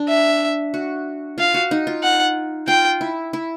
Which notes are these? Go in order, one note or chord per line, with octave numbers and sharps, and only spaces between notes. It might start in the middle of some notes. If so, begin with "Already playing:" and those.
Already playing: D4
E5
F#4
F4 F5
F#4
D#4
F4
F#5
F4 G5
E4
E4